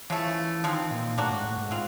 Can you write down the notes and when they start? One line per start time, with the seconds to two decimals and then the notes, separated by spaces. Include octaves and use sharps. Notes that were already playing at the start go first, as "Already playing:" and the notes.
0.10 C#3 E3 F3 A3
0.63 D#3 F3 G#3 C4
0.91 A#2
1.17 A2 A#3 D4 F#4
1.31 G#2
1.44 A2
1.58 G#2
1.71 C4 F4